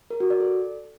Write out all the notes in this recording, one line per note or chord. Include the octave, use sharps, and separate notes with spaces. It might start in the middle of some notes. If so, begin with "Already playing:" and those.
A#4
F#4
D5
A4